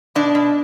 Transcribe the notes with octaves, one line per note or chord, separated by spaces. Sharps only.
B2 D4
B2